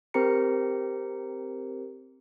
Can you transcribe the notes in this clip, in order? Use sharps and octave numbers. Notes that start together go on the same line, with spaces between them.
C4 G4 A#4 C5 A#5 C#7